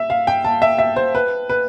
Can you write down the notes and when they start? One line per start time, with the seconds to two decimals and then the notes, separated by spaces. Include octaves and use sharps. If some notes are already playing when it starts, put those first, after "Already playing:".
Already playing: E5
0.10 F5
0.27 G5
0.44 A5
0.62 E5
0.78 E5
0.96 C5
1.15 B4
1.50 B4